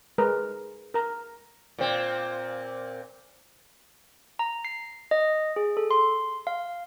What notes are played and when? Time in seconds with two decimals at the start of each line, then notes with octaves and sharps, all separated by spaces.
0.18 G#3 A#4 B4 A#5
0.94 A#4 A#5
1.78 A#2 C4
4.39 A#5
4.65 C7
5.11 D#5
5.56 G#4
5.77 A4
5.91 C6
6.47 F5